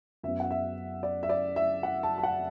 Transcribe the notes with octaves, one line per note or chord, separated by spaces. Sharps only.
F#2 F#3 B3 E5
F#5
E5
D5
E5
D5
E5
F#5
A5
A5
F#5